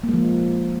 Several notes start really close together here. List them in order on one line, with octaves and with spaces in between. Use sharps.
A#3 G#3 F3